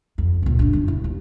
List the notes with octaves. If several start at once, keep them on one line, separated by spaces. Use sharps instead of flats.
F2
C#2 A#2
F#1 D4
F2 D#3
E4
D#2